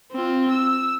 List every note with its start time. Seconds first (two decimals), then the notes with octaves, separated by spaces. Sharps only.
0.12 C4 F4
0.51 E6